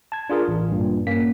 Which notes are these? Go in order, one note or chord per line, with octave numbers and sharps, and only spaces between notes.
A5 G#6
D4 F4 G#4 A#4
A1
G2 A#2
A#3 C#4 B6